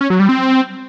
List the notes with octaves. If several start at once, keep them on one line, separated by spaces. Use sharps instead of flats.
C#4
F#3
G3
C4